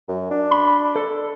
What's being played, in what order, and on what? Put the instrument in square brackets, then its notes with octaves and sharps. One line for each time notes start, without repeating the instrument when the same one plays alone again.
[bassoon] F#2
D4
[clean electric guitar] B5
A4